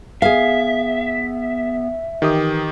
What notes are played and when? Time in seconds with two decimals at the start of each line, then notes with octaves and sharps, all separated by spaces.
0.22 B3 G#4 E5 F5
2.22 D#3 E3 G4 D#6